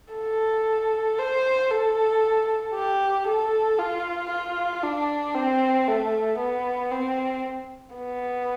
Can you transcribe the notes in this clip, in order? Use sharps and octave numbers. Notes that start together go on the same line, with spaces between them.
A4
C5
A4
G4
A4
F4
F4
D4
C4
A3
B3
C4
B3